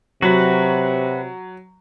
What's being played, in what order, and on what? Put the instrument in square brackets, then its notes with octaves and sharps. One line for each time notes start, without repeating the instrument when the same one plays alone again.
[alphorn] C3 [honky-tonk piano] F#3 [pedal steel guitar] F#4 B4